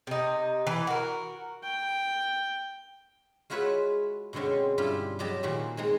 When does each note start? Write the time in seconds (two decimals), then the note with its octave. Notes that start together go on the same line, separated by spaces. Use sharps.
0.07 C3 D#4
0.67 E3
0.87 F#4 A#4
1.63 G5
3.50 G#3 F4 F#4 B4 C#5 E5
4.33 B2 D3 G#3 C4 C#4
4.78 G2 G3 E4 F4 G4
5.19 C3 F#3 G4 D#5 A5
5.43 A#2 D#3 C4 F#4
5.77 G#3 C4 D#4